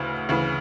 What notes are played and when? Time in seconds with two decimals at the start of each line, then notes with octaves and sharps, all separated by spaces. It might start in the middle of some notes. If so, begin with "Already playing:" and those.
Already playing: D2 C#3 E3
0.29 D2 C#3 E3